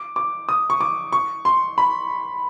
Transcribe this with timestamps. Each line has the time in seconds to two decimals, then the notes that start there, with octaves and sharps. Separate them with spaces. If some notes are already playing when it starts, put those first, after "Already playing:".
Already playing: D6
0.16 D6
0.49 D#6
0.70 C#6
0.81 D6
1.13 C#6
1.45 C6
1.78 B5